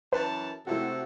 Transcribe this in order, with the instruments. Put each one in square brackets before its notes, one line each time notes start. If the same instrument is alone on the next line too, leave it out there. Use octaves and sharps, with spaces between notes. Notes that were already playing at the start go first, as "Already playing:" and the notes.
[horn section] F#2 E3 A5 [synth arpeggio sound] B4
[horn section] C3 A4 [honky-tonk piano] A3 E4 F#4